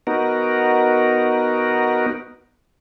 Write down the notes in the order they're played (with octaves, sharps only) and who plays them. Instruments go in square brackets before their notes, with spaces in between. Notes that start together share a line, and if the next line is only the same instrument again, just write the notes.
[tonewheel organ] B3 D#4 F#4 A#4